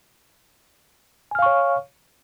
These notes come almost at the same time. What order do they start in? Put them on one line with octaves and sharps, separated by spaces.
G#5 F6 F5 C#6 C#5